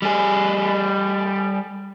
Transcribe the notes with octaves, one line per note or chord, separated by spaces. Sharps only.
G3 G#4